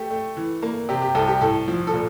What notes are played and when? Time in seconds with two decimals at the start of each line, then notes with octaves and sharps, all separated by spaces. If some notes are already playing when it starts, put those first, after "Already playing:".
Already playing: A3 G4
0.10 A3
0.37 E3
0.63 A#3
0.89 C3 G4
1.02 G4
1.15 C2 A4
1.28 G4
1.41 A2 A4
1.68 F3
1.87 A4
1.93 A#2